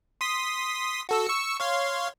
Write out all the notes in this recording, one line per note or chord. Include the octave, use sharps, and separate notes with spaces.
C6 D#6 B6
F#4 A4 E6
C#6 E6 C#7
C#5 F5 C6